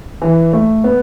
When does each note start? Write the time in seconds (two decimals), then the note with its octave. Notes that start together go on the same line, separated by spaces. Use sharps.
0.22 E3
0.53 A3
0.84 B3